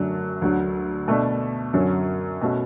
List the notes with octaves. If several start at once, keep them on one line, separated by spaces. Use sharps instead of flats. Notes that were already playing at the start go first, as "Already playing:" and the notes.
Already playing: F#2 D3 F#3 A3 D4
D2 D3 F#3
B2 A3 D4
F#2 D3 F#3 C#4
B2 A3 C#4 F#4